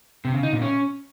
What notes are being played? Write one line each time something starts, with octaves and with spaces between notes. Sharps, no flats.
C3
C#3
D#4
A#2
C#4